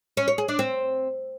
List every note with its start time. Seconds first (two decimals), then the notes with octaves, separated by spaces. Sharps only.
0.17 C#4
0.28 C#5
0.38 G#4
0.48 D4
0.59 C4